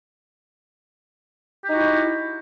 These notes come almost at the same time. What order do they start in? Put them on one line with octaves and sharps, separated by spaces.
G4 D#4 F#4 E4